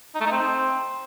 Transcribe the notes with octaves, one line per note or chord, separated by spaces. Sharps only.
D#4
A3
D#4
C4